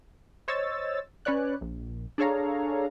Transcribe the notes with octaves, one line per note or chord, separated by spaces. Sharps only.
C5 C#5 D#5 E6 A6
C#4 B4 C#5 D5 F#6
A#1
D4 G#4 A4 C#5 F5 A#5